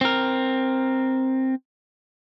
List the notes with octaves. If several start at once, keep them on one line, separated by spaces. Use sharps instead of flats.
C4 A#4